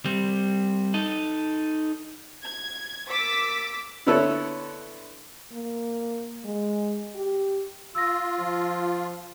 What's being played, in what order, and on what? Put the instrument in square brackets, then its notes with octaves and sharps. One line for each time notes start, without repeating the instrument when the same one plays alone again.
[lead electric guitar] G3 C4
D#4 A4
[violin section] G#6
A#3 D6 E6 A6 B6
[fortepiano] D3 B3 E4 A4 B4 C#5
[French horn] A#3
G#3
G4
[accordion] F4 [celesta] E6 A#6
[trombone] F3